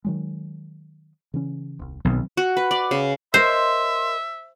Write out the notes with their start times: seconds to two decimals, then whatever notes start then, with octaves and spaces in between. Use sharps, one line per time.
0.05 D#3 F#3 G#3
1.34 C#3 E3 C#4
1.79 D#1 C2
2.05 B1 D#3 F#3 C4
2.37 F#4
2.57 B4
2.71 D5
2.91 C#3
3.34 A#4 C5 C#5 D#5 E5 C6